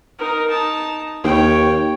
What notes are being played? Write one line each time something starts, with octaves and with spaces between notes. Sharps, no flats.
D#4 A#4
D#4 A5
D#2 C#5 G5